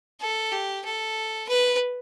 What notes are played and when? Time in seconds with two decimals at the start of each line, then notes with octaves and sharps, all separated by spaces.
0.21 A4
0.52 G4
0.85 A4
1.49 B4